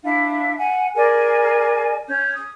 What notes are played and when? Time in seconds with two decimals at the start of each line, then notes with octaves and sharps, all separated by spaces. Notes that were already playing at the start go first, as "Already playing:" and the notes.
0.03 D4 E4 E5 F5
0.58 F#5 G#5
0.94 G#4 A#4 D5 G#5
2.09 C#4 G6
2.34 D#6